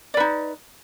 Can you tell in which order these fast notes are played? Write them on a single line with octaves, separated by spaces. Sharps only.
D5 B4 D#4